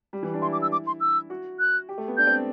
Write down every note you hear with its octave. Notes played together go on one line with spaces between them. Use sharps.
G3
E3
D4
E4 C6
D6
E6
D6
C6
E6
F#4
F#6
G4
A3
B3
D4 G6
C4